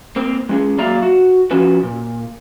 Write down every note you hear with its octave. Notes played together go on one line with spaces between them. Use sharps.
A#3 C4
G#3 C#4 G#4
F#3 A#3 D5 E5 F5 A#5
F#4
F3 C#4 F4 F#4 B4
A#2